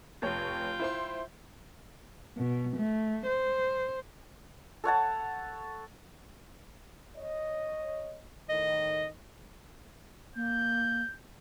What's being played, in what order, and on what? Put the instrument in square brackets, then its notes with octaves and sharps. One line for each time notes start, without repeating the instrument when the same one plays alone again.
[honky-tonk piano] F1 C#5 [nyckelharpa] F4 G5
[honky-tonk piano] E4 C5 C6
[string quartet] B2
A3
C5
[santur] A4 C#5 F#5 A5
[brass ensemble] C#5 D#5
[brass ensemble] A2 D#3 [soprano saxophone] D#5
[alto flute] A#3 [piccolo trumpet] G6